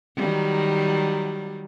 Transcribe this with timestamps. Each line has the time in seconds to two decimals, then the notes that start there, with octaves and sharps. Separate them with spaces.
0.16 D#3 F#3 G3